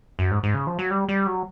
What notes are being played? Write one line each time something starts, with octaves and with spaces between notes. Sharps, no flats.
F#2
G#2
G#2
C#3
F3
F#3
G3
G3
F#3